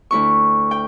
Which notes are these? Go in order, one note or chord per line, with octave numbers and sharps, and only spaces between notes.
D2 E4 C#6
G5